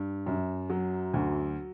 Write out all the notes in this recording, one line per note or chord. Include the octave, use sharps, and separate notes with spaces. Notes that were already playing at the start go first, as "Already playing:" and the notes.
Already playing: G2
F#2
F#3
D2